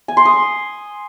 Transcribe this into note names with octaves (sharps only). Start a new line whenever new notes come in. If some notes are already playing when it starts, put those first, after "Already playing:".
G#5
C6
D#6